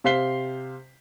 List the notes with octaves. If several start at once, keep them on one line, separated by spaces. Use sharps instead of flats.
C3 C5 F5 B6 C7 G7